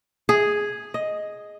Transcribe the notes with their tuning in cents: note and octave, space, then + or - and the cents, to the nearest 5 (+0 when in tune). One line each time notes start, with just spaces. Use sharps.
G#4 +0
D#5 +5